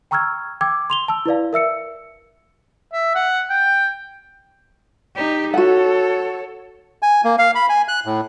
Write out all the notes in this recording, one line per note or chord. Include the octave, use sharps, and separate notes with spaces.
G5 A#5 C#6 E6 F6 G#6
G5 D6 E6 G#6
C6 F7 G7
A5 E6
E4 B4 D5 F5
A#4 E5 E6 C#7
E5
F#5
G5
D#4 G4
F#4 A4 C#5 F#5
G#5
A#3
F5
B5
G#5
F#6
A2